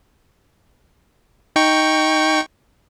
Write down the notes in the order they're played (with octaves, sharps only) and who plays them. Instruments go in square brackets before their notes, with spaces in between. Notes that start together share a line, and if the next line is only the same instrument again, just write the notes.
[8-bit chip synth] D#4 G5 C#6